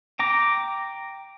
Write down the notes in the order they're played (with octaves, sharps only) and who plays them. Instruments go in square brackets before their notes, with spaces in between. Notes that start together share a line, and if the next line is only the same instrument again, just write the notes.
[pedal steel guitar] G5 A#5 D6